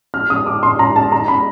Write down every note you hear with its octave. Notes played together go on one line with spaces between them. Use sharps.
F6
D#6
D6
C6
A#5
A5
A#5
B5